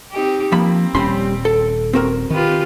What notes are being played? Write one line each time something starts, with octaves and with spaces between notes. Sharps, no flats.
C4 D#4 G4
F3 A#3 C4 B5
D#1 G3 C#4 B5 C6
A4
C4 F#4 A#4
D#3 F4 G4 B4